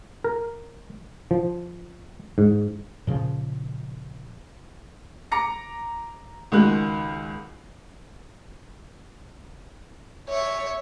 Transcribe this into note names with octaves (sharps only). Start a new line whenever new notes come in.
A#4
F3
G#2
A#2 C#3 F3
A#5 D6 A#6 C#7
C#2 D#3 G#3 F#4 F#6
C#5 E5